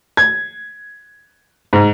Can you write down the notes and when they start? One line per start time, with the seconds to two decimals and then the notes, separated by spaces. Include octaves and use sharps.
0.17 G#6
1.73 G#2